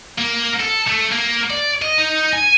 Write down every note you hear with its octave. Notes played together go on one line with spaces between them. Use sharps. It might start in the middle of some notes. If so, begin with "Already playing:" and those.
A#3
A4
A3
A#3
D5
D#5
D#4
G#5